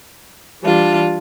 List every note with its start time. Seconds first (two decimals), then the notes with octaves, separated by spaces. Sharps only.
0.62 E3 G3 D4 F4